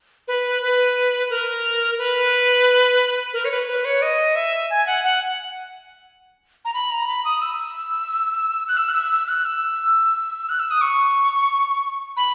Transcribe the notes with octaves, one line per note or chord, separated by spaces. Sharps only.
B4
B4
A#4
B4
A#4
C#5
B4
B4
C#5
D#5
E5
G#5
F#5
F#5
A#5
B5
A#5
B5
D#6
E6
F#6
E6
F#6
E6
E6
F#6
E6
F#6
E6
D#6
C#6
B5